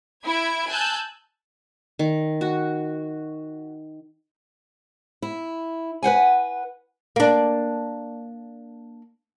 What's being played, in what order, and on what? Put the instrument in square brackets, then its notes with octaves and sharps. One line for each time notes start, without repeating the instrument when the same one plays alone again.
[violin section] E4 G#6 D7
G#5 A5 E6 F#6 G6
[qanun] D#3
F#4
[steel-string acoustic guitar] E4
B4 C5 F#5 G#5
[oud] A#3 D4